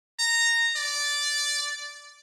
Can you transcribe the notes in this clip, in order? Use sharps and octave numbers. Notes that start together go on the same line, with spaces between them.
A#5
D5